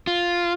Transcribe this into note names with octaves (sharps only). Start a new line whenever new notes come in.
F4